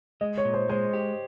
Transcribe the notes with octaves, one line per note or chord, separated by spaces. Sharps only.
G#3 D#5
C#5
A#2
C5
G#3 C5
G4